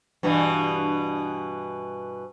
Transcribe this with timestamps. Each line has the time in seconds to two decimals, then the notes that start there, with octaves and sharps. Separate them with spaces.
0.23 G2 B2 E3